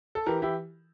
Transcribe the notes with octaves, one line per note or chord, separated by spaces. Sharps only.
A4
E3 G4 A#4
E3 E4 G4